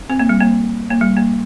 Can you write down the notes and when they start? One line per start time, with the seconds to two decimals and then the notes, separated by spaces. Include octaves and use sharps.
0.10 C4
0.19 A#3
0.29 G3
0.40 A#3
0.90 A#3
1.01 G3
1.17 A#3